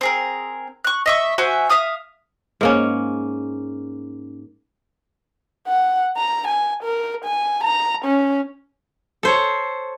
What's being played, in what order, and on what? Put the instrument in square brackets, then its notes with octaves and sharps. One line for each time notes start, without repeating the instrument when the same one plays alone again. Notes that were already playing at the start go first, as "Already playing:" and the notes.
[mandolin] C4 G#4 A#4
C#6 F#6
D#5 E5 C#6
F#4 C5 E5 G#5
E5 F5 D#6 F6
[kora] G#2 A#3 C#4
[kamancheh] F#5
A#5
G#5
A#4
G#5
A#5
C#4
[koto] A4 C5 C#5